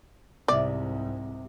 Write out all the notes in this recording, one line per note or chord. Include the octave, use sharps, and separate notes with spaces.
C2 G#2 C3 D5